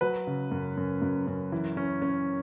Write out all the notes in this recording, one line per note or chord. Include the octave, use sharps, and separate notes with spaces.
F#3 B4
C#3
F#2
F#2
F#2
F#2
E3
C#4
C#4